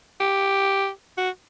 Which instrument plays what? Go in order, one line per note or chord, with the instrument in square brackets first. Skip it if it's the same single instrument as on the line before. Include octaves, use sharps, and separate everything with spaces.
[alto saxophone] G4
F#4